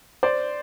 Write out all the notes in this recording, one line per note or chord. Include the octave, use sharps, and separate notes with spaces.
C5 D5